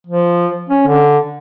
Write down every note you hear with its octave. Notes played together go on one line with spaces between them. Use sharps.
F3
C#4
D3